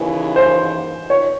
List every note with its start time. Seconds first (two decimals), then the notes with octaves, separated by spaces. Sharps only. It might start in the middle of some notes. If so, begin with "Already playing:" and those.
Already playing: D#2 C#3 E3
0.36 C5
1.10 C#5